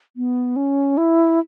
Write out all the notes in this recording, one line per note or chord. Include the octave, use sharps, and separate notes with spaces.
B3
C#4
E4